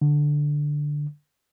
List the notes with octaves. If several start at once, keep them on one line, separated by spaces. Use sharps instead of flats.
D3